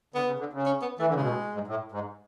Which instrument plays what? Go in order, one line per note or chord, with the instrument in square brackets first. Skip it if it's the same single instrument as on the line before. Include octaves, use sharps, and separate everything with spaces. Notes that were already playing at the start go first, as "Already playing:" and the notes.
[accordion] D3 [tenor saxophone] B3
[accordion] C#3
D3
C#3
[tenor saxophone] C#4
B3
[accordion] E3 [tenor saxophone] A3
[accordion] D3
[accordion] C#3 [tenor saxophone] G#3
[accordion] B2
A2
G#2
A2
G#2